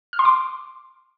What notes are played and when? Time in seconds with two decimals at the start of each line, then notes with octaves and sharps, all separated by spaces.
0.13 F6
0.19 C6
0.25 D6